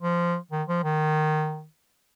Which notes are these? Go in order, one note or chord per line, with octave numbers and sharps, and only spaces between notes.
F3
D#3
F3
D#3